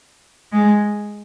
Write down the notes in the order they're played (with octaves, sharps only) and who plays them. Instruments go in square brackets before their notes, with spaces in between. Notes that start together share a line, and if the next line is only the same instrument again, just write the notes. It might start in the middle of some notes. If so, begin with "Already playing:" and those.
[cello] G#3